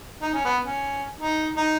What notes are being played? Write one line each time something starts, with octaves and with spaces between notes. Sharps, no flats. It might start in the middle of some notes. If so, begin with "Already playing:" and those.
D#4
C#4
B3
C#4
D#4
D#4